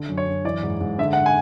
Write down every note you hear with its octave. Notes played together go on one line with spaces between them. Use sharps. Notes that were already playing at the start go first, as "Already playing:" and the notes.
Already playing: D3
F#2
C#5
F#2
E3 D5
G#2
G#2
D3 E5
F#5
G#5